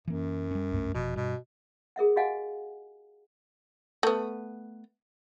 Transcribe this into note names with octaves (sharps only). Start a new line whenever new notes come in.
F#2 E3 A#3
G3 C#4
C2 G2 A3
F1 F2 B2
G2 B2
G#4 A#4 E5 F#5
F#4 G4 D#5 F5 F#5 G#5
A3 B3